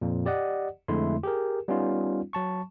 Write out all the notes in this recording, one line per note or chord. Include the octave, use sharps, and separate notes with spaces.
F2 A#2
G4 D5 D#5 F#5
F2 D3 G#3 A3 E4 C6
G4 G#4 A#4
G3 B3 C#4 D#4 F4
F#3 A5 C#6